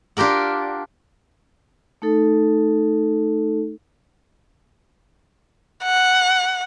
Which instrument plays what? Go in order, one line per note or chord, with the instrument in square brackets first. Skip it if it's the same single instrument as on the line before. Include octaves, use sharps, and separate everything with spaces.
[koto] D4 F4 G4 A#4 F#5
[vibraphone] A3 D#4 A4
[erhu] F#5